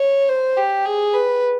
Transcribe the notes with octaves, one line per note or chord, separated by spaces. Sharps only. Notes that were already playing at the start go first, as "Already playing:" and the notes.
Already playing: C#5
C5
G4
G#4
B4